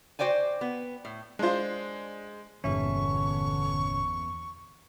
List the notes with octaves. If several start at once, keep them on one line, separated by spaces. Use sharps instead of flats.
F#4 C5 D5 G5 G#5
B3
A2
G#3 D4 F4 C5
G1 E2 A#2 D3 C#4 E5 C#6